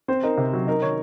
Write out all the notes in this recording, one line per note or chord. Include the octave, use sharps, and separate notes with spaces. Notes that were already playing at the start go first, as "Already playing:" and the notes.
C4 C5
D#4 A#4
C3
F#3
D#4 A#4
D#3 C#5